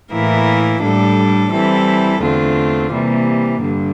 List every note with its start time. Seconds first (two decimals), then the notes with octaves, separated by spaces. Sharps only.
0.11 A2 E3 A#3 E4 A#4
0.81 A2 G3 D4 A4
1.51 E3 G3 C4 E4 A4
2.21 E2 D3 A3 C4 F4
2.91 C3 E3 G3 A#3
3.62 G2 D3